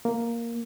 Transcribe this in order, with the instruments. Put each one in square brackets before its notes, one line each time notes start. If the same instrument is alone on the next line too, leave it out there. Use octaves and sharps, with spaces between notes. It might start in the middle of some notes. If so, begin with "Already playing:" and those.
[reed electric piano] A#3